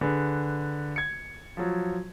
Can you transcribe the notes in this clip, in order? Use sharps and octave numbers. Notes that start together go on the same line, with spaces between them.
D3 G#4 B4
G#6 C#7
F3 F#3